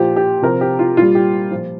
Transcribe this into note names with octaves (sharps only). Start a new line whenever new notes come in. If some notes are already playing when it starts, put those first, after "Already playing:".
Already playing: A#2 F3 G4
G4
C3 F3 A#4
G4
F4
A#2 G3 F4
G4
A#2 F3